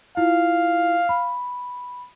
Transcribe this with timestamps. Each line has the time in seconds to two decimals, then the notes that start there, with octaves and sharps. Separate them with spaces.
0.17 E4 F4 F5
1.09 B5